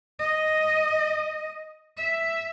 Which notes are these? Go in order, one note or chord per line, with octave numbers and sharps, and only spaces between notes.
D#5
E5